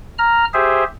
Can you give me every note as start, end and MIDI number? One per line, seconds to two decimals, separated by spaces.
0.19 0.45 82
0.19 0.45 89
0.54 0.84 67
0.54 0.84 68
0.54 0.84 72
0.54 0.84 76